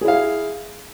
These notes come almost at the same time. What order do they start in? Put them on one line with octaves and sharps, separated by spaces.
G#4 E4 F5